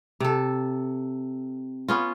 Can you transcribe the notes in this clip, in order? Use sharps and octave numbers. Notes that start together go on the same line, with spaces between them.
C3 A4
B3 C#4 F4